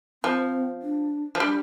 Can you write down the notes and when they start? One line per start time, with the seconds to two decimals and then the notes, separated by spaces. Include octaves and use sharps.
0.24 F3 C4
0.82 D4
1.35 F3
1.40 G3 D4